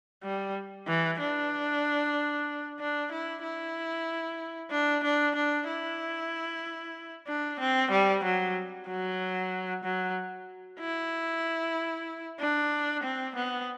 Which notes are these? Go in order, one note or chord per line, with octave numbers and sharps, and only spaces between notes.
G3
E3
D4
D4
E4
E4
D4
D4
D4
E4
D4
C4
G3
F#3
F#3
F#3
E4
D4
C4
B3